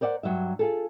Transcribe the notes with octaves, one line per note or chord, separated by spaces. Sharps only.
A#4 C5 D5 E5 F#5
G2 F#3 G3 E5
F4 G#4 A4